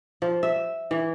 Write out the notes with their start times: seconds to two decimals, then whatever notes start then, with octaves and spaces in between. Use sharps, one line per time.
0.22 F3
0.43 E5
0.91 E3